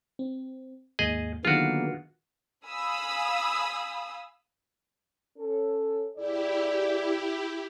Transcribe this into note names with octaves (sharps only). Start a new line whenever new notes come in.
C4
D#2 G#2 A#3 G#4 D#5
D3 D#3 F#3 A#3 B3 F4 F#4 G#4
F5 G#5 B5 D#6 E6
C#4 A4
A#2 E4 G4 G#4 D5